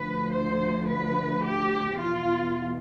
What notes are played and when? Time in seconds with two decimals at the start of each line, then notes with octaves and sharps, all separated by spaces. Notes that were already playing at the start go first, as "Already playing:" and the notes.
Already playing: D2 D3 F3 B4
0.31 C5
0.87 B4
1.43 G4
1.99 E2 B2 F4